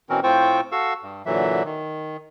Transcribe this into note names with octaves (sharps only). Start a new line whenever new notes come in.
B2 E3 C4 C#4 A#4
A2 C4 F4 C5 G5 C#6
F#4 A4 F5 C#6 E6
G2
A#2 D3 E3 F#3 E5
D#3